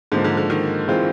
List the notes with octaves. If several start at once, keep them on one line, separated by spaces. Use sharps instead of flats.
G#2 D3 F3 A#3
D3
D3
D#3
E3 G#3 C4 F4